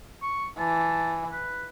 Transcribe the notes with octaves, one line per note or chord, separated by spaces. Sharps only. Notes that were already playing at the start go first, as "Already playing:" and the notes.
C#6
E3 A5
B4